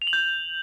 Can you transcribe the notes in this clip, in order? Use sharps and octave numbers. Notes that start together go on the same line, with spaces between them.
F7
F#7
G6